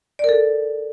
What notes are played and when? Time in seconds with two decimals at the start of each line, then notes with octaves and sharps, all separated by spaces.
0.19 D5
0.24 A#4
0.29 A4